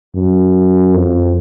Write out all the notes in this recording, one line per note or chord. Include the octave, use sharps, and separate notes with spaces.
F#2
F2